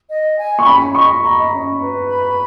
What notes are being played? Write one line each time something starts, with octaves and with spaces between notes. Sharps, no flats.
D#5
G#5
C#6
C#4 B5
D#5 C#6
D#5 A#5
C#4
B4
B5